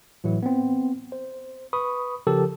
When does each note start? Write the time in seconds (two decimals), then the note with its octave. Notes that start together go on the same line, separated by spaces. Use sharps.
0.24 A2 E3 F#3 E4
0.43 B3 C4
1.12 C5
1.73 B4 B5 C#6 D#6
2.27 C#3 F3 G4 A4 A#4